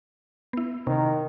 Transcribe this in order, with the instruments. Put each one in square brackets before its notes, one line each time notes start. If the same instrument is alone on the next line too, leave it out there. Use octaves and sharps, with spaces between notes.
[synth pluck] B3 E4
[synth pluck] C3 [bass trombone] D#3